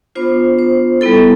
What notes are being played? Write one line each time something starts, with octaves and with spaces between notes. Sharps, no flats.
B3 D4 F4 C5
C5
G3 B3 E4 A4